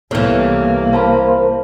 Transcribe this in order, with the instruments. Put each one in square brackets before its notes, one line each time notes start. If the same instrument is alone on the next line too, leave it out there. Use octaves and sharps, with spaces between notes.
[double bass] C2 A#3 [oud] C3 E3 [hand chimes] B3 A4 C#5
[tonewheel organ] A#4 C5 [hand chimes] F5 A5 B5